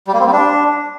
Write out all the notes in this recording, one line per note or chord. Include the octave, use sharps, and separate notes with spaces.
G3
A#3
C4
G3
D4